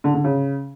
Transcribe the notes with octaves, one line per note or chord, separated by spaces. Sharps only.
D3
D3
C#3